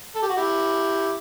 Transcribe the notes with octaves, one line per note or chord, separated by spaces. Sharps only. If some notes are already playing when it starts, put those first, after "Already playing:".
A4
G4
F#4
E4 G4